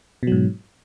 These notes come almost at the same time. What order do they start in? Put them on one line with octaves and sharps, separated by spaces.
B2 F#3 G#2